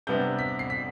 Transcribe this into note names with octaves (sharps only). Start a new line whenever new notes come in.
C3 G3 B3 D4 G6
B6
C7
B6